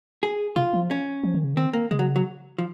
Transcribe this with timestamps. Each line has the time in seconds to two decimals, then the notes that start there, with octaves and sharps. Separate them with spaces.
0.23 G#4
0.56 C3 F4
0.73 F3
0.91 C#4
1.24 F3
1.34 D#3
1.44 C#3
1.55 D#3 C4
1.73 A#3
1.91 C#3 G#3
1.99 F#3
2.16 F#3
2.58 F3